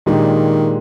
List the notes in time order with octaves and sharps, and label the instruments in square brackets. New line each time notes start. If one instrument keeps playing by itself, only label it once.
[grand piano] A#2 G#3 D4 G4 [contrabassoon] D#3